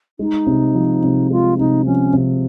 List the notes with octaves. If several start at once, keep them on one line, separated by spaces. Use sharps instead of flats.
G#3 D#4
C3
F3
C3
G#3 F4
C3 D#4
F3 C#4
C3